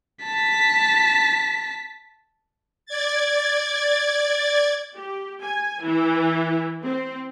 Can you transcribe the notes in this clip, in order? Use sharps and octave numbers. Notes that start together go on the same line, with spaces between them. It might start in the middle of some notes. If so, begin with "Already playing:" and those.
A5 B6
D5 G#6 A6
G4
G#5
E3
C4